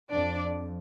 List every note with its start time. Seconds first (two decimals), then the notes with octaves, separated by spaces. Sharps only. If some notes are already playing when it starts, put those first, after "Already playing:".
0.12 F2 D4 D5